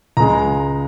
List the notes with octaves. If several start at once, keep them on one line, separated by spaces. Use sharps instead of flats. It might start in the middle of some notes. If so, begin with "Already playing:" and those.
C#2 C#3 G#3 A#5